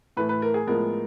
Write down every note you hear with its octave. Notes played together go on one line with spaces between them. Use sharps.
A2 E3 A3 B4
B4
A#4
G#4
A2 F3 G#3 B3 A#4